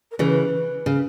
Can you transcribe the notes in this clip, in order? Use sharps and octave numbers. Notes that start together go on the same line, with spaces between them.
A#4
C#3 E3 B4
C#3